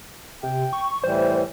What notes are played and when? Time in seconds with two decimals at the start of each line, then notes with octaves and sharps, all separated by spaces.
0.43 C3 G5
0.73 C#6
1.04 A2 E3 G3 C5